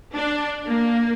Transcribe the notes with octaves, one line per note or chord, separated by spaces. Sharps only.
D4
A#3